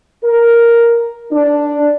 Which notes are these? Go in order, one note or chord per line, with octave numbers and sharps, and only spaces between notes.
A#4
D4